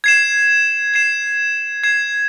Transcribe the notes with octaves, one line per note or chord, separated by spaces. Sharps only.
G#6 C7 E7
G#6 C7 E7
G#6 C7 E7